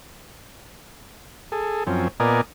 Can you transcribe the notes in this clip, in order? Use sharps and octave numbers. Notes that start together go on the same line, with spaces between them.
G#4 A4
F#2 F3 C4 C#4
A#2 B3 A#4 D5 D#5 G#5